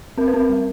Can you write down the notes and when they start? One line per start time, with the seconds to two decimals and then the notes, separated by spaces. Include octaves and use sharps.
0.18 C4 A#4
0.28 B4
0.34 C4 A#4
0.49 G3